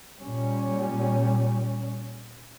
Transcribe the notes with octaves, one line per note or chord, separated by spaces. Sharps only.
A#2 G3 C#4